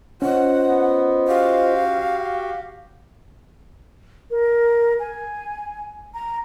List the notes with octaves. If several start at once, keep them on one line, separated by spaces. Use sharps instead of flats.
C#4 F4 C5 D#5 F#5
B3
F#4 G4 F5
A#4
G#5
A#5